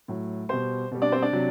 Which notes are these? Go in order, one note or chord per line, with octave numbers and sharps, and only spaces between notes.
A2 F#3
B2 G3 C5 C6
B2 G3
D4 D5
C4 C5
D4 D5
C3 F#3